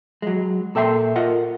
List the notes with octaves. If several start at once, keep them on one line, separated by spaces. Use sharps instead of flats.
F#3 G#3
A#2 A4 E5 G5 A#5 C6
F4 A#4 D#5 F#5